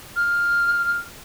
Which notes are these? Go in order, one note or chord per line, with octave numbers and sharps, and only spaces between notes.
F6